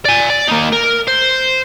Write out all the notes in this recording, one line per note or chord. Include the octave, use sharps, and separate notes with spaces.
D5 G#5
D5
A#3 D#4
A#4
C5